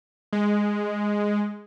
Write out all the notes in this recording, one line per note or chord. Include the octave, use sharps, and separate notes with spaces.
G#3